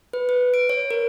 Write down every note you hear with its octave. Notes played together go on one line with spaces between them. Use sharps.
B4
B4
D7
C#5
A#4